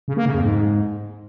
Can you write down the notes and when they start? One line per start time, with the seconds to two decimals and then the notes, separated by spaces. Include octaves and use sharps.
0.08 C#3
0.17 A#3
0.26 C#3
0.34 F2
0.43 G#2